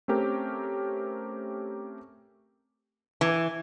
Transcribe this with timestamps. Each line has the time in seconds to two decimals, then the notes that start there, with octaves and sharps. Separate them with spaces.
0.08 A3 C4 C#4 G4 A#4
3.21 E3